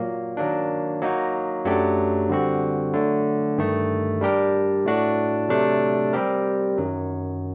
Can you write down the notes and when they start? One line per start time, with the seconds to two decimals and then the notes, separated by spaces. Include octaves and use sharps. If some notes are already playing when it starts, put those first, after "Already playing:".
Already playing: A#2 F#3 A#3
0.37 D#3 F#3 A#3 D4
1.02 F#3 A#3 D#4 F#4
1.65 F#2 F#3 A3 D4 G4
2.29 D3 G3 C4 F#4
2.93 D3 F#3 A3
3.58 G2 D#3 A3
4.21 G3 D4 G4 A#4
4.85 A2 A3 D4 F#4
5.49 C3 F#3 A3 D4
6.13 G3 C4 G4 A#4
6.78 F#2 D#3 F#3